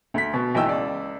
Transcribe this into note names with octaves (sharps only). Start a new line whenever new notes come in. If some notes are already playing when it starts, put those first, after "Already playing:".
D2 B6
B2
B1 E3 G5 E6
C#2 D5